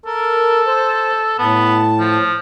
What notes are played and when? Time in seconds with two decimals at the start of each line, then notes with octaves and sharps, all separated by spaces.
0.06 A4 A#4
0.67 C5
1.39 A2 B3 A5
2.00 F3